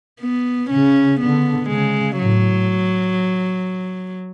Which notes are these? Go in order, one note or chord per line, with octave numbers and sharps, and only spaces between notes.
B3
C#3 C#4
D3 B3
C#3 G#3
A2 F#3